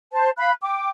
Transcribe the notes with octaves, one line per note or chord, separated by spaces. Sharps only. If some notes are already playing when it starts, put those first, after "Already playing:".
C5 A5
F5 B5 F#6
G5 D6